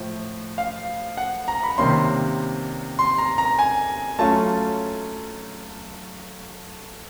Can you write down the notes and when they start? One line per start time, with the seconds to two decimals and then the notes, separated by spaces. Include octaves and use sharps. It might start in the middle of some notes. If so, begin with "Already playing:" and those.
Already playing: A2 F3
0.58 F5
1.17 F#5
1.48 A#5
1.63 B5
1.78 C3 D#3 G3 A#3 C#4 C6
2.99 C6
3.18 A#5
3.38 A#5
3.59 G#5
4.19 F#3 A3 C#4 F4 A5